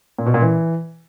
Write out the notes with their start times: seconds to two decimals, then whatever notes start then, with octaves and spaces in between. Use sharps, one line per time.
0.18 A#2
0.26 B2
0.34 A#2
0.42 E3